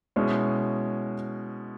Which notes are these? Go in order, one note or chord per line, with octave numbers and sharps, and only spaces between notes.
B2 G#3 C#4 E4